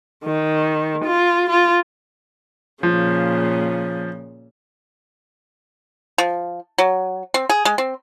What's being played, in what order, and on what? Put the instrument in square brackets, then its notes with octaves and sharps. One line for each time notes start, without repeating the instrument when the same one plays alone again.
[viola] D#3
F4
F4
[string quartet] A#2 C#3 [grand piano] F3
[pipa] F3
F#3
C4
G#4
G#3
C4